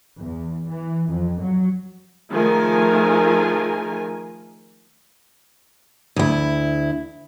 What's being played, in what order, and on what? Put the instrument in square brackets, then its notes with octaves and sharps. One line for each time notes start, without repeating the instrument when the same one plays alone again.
[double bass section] E2
E3
F2
F#3
[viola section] D#3 F3 A3 G#4 A#4 G#5
[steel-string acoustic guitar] D2 E4